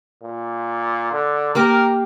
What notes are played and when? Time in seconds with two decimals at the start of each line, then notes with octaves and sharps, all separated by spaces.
0.23 A#2
1.12 D3
1.55 A#3 G4 A#4 D6